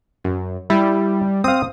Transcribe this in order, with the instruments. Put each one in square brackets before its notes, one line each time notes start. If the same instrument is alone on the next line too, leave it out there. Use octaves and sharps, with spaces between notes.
[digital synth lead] F#2
[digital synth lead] G3 [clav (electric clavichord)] E4
[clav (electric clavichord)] C4 F5 [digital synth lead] D#6